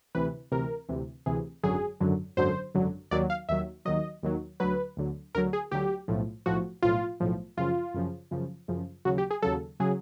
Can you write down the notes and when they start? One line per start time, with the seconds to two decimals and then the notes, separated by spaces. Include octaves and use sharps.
0.15 D2 C3 E3 B4
0.52 D2 C3 E3 A#4
0.89 D2 C3 E3
1.26 D2 C3 E3 G#4
1.63 G#1 F#2 D3 F#3 G#4
2.00 G#1 F#2 D3 F#3
2.37 G#1 F#2 D3 F#3 C5
2.75 G#1 F#2 D3 F#3
3.11 D#2 D#3 F#3 D5
3.30 F5
3.49 D#2 D#3 F#3 E5
3.85 D#2 D#3 F#3 D#5
4.23 D#2 D#3 F#3
4.60 D2 D3 F#3 B4
4.97 D2 D3 F#3
5.35 D2 D3 F#3 A#4
5.53 G#4
5.71 D2 D3 F#3 G4
6.08 B1 A2 F3
6.46 B1 A2 F3 F#4
6.82 B1 A2 F3 F4
7.20 B1 A2 F3
7.57 F#2 C#3 F3 F4
7.94 F#2 C#3 F3
8.31 F#2 C#3 F3
8.68 F#2 C#3 F3
9.05 D#2 C#3 F#3 F#4
9.18 G4
9.31 G#4
9.42 D#2 C#3 F#3 A4
9.80 C#3 F#3 G#4